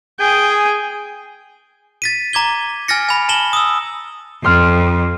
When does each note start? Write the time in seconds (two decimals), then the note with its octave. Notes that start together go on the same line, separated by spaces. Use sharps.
0.20 G#4 G5 G#5
2.02 A6 B6 D#7
2.33 A#5 D6 G#6 G7
2.88 G#5 F6 A6 A#6 C#7
3.09 G#5 B5
3.29 A5 B5 E7 F#7 G7
3.53 D#6 E6
4.44 F2 C6 F6